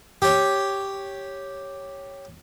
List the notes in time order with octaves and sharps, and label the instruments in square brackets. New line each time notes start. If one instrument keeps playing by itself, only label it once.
[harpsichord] G4 C#5